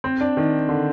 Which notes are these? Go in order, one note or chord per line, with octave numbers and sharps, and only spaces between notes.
C4
D4
D#3
D3